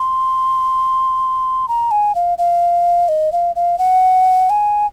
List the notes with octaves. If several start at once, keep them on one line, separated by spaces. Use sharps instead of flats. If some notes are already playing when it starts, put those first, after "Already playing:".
Already playing: C6
A#5
G#5
F5
F5
D#5
F5
F5
F#5
G#5